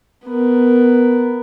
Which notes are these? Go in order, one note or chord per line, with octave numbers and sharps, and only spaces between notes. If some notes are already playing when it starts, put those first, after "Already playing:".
B3 A#4